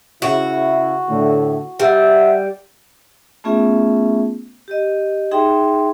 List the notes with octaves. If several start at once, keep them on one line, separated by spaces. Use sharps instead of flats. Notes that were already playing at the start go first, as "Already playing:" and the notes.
C#3 E4 F#4
A2 D3
G3 E5 F#5
A3 B3 C#4 F4 G#4 E5
G4 D#5
D#4 G#4 E5 G5 C6